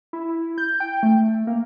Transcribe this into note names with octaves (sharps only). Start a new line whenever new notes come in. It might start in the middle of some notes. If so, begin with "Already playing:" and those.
E4
G6
G5
A3
A#3